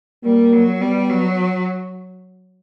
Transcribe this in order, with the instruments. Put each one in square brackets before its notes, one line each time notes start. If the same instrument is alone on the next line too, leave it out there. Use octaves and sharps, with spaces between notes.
[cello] G3 [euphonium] A#3
[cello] F#3
[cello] G3 [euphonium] B3
[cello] F#3